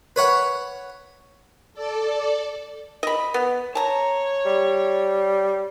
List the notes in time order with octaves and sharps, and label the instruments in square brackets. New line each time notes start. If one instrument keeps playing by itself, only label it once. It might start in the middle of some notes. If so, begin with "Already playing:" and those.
[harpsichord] B4 C#5 F#5
[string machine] A4 D5
[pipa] D#5 B5
B3
[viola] C#5 [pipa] A5 A#5
[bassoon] G3